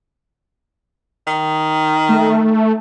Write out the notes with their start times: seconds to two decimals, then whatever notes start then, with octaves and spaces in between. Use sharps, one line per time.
1.27 D#3
2.09 A3